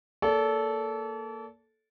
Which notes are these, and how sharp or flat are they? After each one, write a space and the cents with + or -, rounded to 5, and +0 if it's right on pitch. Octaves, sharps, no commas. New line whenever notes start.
A#3 +0 A4 -10 D5 -40